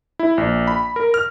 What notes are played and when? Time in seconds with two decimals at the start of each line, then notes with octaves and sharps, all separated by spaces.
0.19 E4
0.38 A#1
0.67 B5
0.96 A#4
1.14 F6